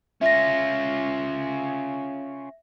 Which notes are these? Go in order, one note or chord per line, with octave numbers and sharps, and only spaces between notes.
C#4 F4 E5 A#6